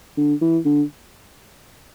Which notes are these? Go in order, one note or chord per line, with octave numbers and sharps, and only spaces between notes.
D3
E3
D3